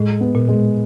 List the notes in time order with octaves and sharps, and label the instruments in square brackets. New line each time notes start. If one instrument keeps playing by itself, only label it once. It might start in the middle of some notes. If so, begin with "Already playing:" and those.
Already playing: [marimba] A2 [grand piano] G#3
[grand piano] B3
[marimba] A#2
[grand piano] G#3